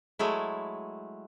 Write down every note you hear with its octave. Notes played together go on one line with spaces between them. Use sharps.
F#3 G#3 A3 E4